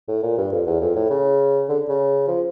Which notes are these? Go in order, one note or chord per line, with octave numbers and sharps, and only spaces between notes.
A2
A#2
G2
F2
E2
F2
A2
C#3
D3
C#3
F3